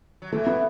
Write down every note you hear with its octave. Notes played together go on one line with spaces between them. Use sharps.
F#3
E2 E3 A3
B3